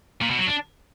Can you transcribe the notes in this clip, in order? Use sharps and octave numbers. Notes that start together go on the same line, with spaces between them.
A#2
B2
F#3
D4